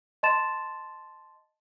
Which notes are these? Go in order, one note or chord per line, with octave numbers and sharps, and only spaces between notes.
D#5 A5 C6 A6 E7